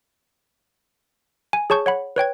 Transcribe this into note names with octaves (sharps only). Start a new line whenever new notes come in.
G#5
G#4 C#5 A5 C#6 G6
C#5 F#5 B5
B4 C#5 G5 G#6